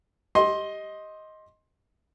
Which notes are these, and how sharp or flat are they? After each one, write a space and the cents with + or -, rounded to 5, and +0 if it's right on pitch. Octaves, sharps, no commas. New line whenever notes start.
G4 +0 D#5 +10 C6 +15